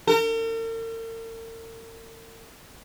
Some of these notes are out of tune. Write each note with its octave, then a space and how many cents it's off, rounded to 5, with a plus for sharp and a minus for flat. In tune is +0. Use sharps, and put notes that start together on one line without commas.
A#4 -45